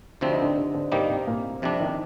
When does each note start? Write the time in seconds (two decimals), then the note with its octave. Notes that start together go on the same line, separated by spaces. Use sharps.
0.21 D2 C3 F3 C4 D4
0.32 D#4
0.42 D3 D4
0.56 C3 C4
0.74 D3 D4
0.92 C3 D#3 G3 A#3 C4 D#4
1.09 C3 C4
1.27 A#2 A#3
1.62 F2 C3 F3 G3 D4
1.80 D#3